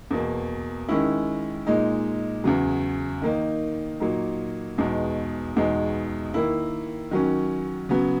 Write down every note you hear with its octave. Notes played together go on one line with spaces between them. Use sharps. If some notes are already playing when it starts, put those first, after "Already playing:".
E2 B2 A#3
D#3 G#3 C#4 E4
A#2 G#3 D#4
E2 C#3 F#3
D#3 A#3 D#4
A#2 F#3 A#3 D#4
E2 B2 G#3 D#4
E2 B2 G#3 D#4
D#3 A#3 E4
D#3 F#3 C#4
C#3 F#3 B3